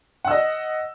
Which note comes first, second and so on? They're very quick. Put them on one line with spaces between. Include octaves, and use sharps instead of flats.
F#5 E6 D#5